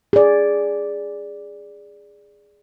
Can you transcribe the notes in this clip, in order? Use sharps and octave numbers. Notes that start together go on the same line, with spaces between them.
G#4 D5